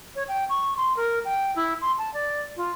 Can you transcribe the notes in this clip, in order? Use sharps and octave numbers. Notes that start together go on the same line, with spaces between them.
C#5
G5
C#6
C6
A#4
G5
E4
C6
A5
D5
F4